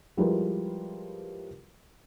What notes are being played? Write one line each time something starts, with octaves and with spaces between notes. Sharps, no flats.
F3 G3 G#3 E4 A#4 B4